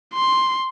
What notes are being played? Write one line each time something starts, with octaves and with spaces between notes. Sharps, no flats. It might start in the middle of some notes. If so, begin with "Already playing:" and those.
C6